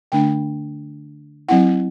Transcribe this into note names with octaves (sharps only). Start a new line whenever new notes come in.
D3 A3 D4 G5
F#3 C4 E4 F#5